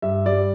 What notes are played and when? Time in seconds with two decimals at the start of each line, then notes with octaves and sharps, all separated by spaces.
0.02 G2 E5
0.25 G3 D5